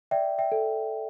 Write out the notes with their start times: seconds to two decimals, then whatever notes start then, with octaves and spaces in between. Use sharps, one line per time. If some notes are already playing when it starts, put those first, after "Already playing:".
0.11 D5 E5 G5
0.39 E5 G5
0.52 A4